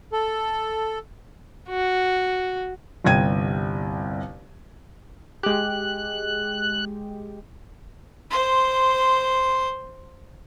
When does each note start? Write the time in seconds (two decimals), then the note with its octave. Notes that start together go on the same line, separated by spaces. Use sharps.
0.13 A4
1.69 F#4
3.04 G1 C2 G5 G#6 D#7
5.43 G#3 G4 F#6
8.30 C5 C6